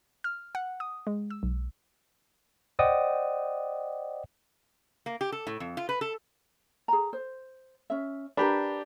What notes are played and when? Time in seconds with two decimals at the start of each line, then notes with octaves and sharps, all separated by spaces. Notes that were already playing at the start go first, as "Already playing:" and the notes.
0.24 F6
0.55 F#5
0.80 D#6
1.07 G#3
1.30 E6
1.43 B1
2.79 C5 D5 D#5 F#5 G5 D#6
5.06 A#3
5.21 G4
5.32 A4
5.47 A2
5.60 F2
5.77 F4
5.89 B4
6.01 A4
6.88 G#4 A#5
7.13 C5
7.90 C#4 E5
8.37 D4 G4 A#4 B4